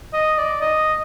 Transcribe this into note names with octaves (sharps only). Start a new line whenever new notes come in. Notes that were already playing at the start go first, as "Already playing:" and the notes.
D#5
D5
D#5